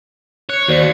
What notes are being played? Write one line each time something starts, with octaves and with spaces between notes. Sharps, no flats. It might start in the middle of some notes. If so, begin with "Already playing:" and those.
C#5 F#6 C#7
D#2 F#4 C5 D5